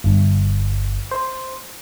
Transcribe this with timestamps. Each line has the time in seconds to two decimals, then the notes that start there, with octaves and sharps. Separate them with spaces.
0.04 G1
1.11 C5